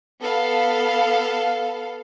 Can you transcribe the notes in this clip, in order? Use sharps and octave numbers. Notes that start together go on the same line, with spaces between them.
B3 A4 F5